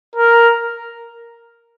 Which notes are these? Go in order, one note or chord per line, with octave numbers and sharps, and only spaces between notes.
A#4